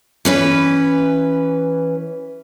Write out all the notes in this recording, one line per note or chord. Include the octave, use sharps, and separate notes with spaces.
E3 C#4 B4